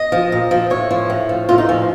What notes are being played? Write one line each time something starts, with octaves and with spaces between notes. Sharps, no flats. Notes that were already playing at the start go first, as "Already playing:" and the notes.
Already playing: D#5
F3
A#2
F3
A2 C#5
F3
A2
F3
A2 F4
D#4
F3 C#4